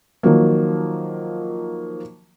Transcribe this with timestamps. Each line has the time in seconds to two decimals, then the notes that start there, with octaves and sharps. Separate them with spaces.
0.23 D#3 F3 F#3 A#3